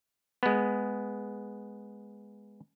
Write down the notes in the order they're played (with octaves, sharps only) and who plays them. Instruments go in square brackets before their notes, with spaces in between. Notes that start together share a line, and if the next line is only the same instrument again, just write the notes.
[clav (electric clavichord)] G#3 B3